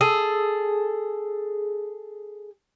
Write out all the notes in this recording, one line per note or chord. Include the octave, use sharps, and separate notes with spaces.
G#4 A4